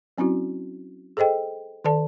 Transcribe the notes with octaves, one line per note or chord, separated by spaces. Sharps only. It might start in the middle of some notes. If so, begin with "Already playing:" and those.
F#3 C4 C#4 E4 F#4
G#4 A4 C5 D#5 G5
D#3 A4 D5 A5